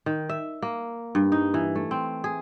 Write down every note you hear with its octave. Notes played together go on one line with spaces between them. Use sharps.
D#3
E5
A#3
G2
D#4
E3
A3
C4
G#4